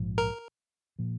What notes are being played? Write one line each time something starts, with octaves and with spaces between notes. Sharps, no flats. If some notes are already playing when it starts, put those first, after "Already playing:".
Already playing: A#1 G#2 F3
A#4
A#2 F3